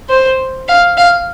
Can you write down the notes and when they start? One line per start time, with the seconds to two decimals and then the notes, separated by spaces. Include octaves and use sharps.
0.10 C5
0.68 F5
0.97 F5